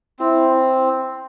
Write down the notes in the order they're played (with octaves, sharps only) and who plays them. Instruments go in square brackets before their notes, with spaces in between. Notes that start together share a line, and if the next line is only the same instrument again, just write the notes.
[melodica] C4 [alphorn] E4